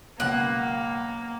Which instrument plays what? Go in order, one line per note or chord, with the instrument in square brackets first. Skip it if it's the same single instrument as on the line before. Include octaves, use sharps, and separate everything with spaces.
[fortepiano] C#2 F#2 B2 [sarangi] A#3 [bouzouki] F#5